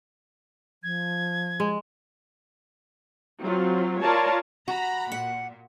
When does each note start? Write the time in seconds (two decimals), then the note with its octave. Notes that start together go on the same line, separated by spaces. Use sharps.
0.83 F3 G#6
1.60 G#3
3.40 F#3 C4 F4
4.01 F4 A#4 C#5 D5 A5
4.68 F#4 A#5 B5
5.12 A#2 F#5